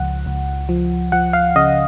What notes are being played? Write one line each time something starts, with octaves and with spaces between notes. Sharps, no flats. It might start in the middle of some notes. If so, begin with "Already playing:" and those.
Already playing: C#2 F3 F#5
C#2
F3
F3 F#5
F5
C#3 D#5